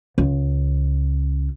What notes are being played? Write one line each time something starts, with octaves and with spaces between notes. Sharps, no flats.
C#2